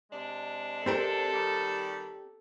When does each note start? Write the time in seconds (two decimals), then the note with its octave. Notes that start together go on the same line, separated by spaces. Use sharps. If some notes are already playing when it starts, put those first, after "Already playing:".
0.11 C3 G#3 D4
0.86 C4 G4 A4 A#4
1.33 D#3 G3